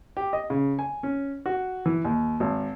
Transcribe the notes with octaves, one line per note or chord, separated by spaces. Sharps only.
G4
D#5
C#3
G#5
C#4
F#4
E3
D#2
G#1